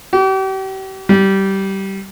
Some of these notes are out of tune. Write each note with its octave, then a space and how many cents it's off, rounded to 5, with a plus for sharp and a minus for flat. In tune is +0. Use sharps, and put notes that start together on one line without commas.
G4 -40
G3 -15